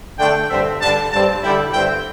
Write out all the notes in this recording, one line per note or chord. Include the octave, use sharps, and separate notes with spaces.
D3 A3 D4 G5
G2 D3 C4 E5
G2 D3 G3 D4 A5
G2 G3 C4 A5
D3 G3 E4 G5
G2 D3 C4 E4 G5